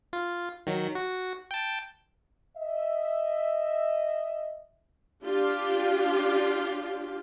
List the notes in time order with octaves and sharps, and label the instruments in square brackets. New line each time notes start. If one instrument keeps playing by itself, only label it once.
[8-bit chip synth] F4
D#3 F#3
F#4
G5 A5
[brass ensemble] D#5 E5
[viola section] D4 F4 G4